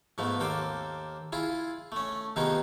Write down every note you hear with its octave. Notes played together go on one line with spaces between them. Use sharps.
G#2 F3 A3 B3
D#2 A#3 A4 C5 D6
E4 F4 G#4
A3 C#4
C3 D#3 F3 B3 D#4 G#4